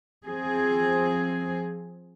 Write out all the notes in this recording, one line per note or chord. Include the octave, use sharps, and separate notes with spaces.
F3 C4 G#4